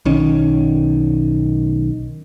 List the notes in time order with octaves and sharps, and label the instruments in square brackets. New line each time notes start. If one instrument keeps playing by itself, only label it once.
[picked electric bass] B1 D#3 C#4